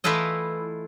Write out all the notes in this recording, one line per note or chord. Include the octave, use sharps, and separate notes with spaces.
E3 A3 E4 F4 A4 D#5